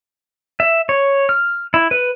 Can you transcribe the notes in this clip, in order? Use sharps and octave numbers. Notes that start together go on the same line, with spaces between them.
E5
C#5
F6
E4
B4